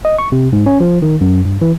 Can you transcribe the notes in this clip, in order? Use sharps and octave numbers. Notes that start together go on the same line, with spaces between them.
D#5
C#6
C3
G#2
C#4
F3
D#3
F#2
G2
E3